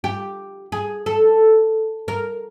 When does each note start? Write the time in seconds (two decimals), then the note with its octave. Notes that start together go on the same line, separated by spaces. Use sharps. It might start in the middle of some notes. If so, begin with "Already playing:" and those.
0.04 G4
0.72 G#4
1.06 A4
2.08 A#4